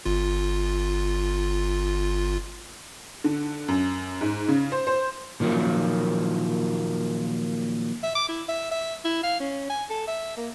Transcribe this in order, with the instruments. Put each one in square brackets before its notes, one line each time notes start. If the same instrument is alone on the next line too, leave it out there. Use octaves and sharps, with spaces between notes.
[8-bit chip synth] G1 F4
[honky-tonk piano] D3
F#2
G#2
C#3
C5
C5
[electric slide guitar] A#2 D#3 F3 F#3 A#3
[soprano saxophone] E5
D6
E4
E5
E5
E4
F5
C#4
G#5
A4
E5
A#3